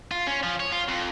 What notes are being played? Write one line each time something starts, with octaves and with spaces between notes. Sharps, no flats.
F4
C#4
F3
C#5
F4
F2